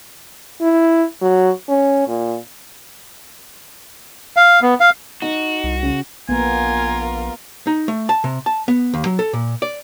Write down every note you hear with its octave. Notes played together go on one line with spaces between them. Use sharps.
E4
F#3
C#4
A#2
F5
B3
F5
D#4 F#4
C2
C#3
A#1 A#3 B3 F4 A#4 G#5
D#4
A3
A5
C3
A5
B3
D#2
F#3
A4
A#2
D5